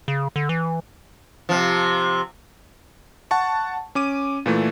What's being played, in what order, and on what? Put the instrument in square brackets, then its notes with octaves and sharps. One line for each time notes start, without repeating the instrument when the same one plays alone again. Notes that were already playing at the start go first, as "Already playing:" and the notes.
[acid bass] C#3
D3
E3
[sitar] C3 F3
[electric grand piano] F#5 A5 C#6
C#4 D6 D#7
A#2 E3 A3